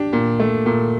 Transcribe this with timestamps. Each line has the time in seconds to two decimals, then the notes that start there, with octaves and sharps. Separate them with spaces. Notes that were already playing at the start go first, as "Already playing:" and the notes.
Already playing: D4 G4
0.13 A#2
0.40 A3
0.66 A#2